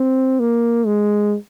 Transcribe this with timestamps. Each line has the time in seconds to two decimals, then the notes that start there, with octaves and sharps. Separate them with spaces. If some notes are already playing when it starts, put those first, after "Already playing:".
Already playing: C4
0.40 A#3
0.86 G#3